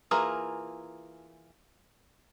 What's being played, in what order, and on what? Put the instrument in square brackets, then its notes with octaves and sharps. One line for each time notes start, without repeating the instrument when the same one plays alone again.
[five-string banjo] E3 A#3 F4 G#4 A#4